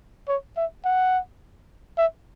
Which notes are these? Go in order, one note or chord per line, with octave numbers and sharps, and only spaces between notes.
C#5
E5
F#5
E5